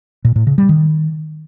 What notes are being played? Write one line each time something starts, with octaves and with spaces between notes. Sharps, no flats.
A#2
A2
C#3
G3
D#3